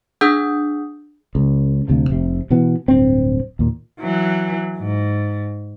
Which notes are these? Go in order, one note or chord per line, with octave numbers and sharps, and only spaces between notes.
D4 G#4 F#5 D#6 E6 G6
C#2
D2 C3 F3
F1 C3
B2 E3 B3
D1 G2 C4
D#2 A#2
E3 F#3
G#2